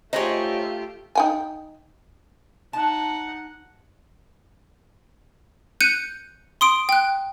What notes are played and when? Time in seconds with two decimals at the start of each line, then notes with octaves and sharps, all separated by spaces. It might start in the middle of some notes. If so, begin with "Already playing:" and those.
0.13 A3 D#4 F4 G4 G#4 C5 C#5 D#5
1.15 D#4 G5 G#5
2.73 D#4 F#5 A5
5.81 F#6 G6 C#7 D#7
6.61 C6 D#6 D7
6.89 G5 F#6